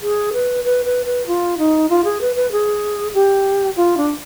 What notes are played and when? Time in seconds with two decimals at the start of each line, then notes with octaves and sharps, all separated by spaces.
0.02 G#4
0.33 B4
0.65 B4
0.86 B4
1.06 B4
1.27 F4
1.58 D#4
1.90 F4
2.05 G#4
2.21 B4
2.36 B4
2.52 G#4
3.14 G4
3.76 F4
3.97 D4